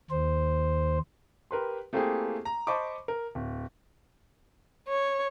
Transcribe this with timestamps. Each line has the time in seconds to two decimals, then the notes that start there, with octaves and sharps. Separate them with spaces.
0.11 D#2 C5
1.51 G4 A#4 B4 C6
1.93 A3 A#3 C4 E4 G4 G#4
2.45 A#5
2.67 C5 D#5 A5 B5 C#6 D6
3.08 A#4
3.35 D1
4.88 C#5